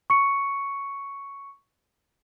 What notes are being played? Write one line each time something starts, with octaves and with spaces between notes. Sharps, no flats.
C#6 C#7